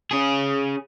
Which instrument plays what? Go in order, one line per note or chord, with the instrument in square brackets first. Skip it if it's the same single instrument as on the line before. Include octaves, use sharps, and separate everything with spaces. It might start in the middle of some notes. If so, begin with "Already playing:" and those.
[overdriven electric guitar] C#4 G#4